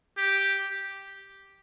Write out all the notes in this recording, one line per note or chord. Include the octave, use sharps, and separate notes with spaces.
G4